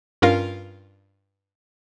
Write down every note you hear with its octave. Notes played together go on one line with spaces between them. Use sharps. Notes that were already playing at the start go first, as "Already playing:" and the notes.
G2 C#4 F4 A#4 F5